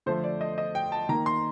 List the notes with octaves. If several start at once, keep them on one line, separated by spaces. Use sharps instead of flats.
D3 F3 A3 C5
D5
D#5
D#5
G5
A5
D#3 A#3 A#5
C6